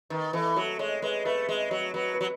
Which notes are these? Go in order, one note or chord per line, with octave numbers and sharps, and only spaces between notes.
D#3 B4
E3 A4
F#3 A4
G#3 C#5
G#3 B4
A3 B4
G#3 B4
F#3 C#5
F#3 B4
B4
F#3